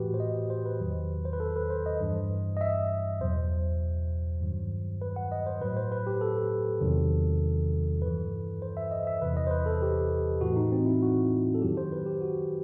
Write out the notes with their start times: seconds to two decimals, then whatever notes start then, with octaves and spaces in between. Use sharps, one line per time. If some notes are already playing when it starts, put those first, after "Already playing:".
Already playing: A2 E3 F#4 G4 B4
0.14 C5
0.20 D#5
0.50 C5
0.66 B4
0.80 E2 D#3 F#3
1.25 C5
1.33 B4
1.40 A4
1.56 B4
1.70 C5
1.86 D#5
2.01 G2 E3
2.57 D#5
2.61 E5
3.21 E2 B2 F#3 C5
4.41 G2 D#3 F#3
5.02 B4
5.16 F#5
5.32 D#5
5.46 C5
5.61 A2 F#3 B4
5.77 C5
5.92 B4
6.07 G4
6.21 A4
6.81 E2 C3 D#3 F#3
8.01 G2 E3 B4
8.62 C5
8.77 E5
8.91 D#5
9.07 E5
9.22 E2 C3 E3 B4
9.37 D#5
9.47 C5
9.51 B4
9.66 A4
9.82 G4
10.41 A2 E3 F#4
10.56 D#4
10.72 C4
10.86 E4
11.02 F#4
11.55 A4
11.62 F#2 D#3 F#3 G4
11.77 C5
11.92 B4
12.06 G4
12.22 F#4